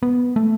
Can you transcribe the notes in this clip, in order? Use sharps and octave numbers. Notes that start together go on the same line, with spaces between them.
B3
A3